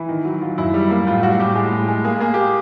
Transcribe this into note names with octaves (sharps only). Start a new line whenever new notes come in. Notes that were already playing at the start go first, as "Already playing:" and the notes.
Already playing: E3 E4
D#3
F#3
F#3 F4
F#2 E4
G3
A#3
A2 F4
G3 F#4
A2 G4
G#3
A2
G#3
A#3 G#4
A#3 G#4
G4